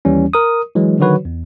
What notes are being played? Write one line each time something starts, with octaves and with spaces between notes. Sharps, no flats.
D#2 E3 G3 C#4
A#4 D#6
E3 F#3 G#3
D3 D#3 F#3 F#4 B4 C#5
E2